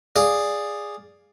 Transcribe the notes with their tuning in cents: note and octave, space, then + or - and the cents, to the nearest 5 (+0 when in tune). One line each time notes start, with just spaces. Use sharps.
G#4 -10 D5 +0 F5 +0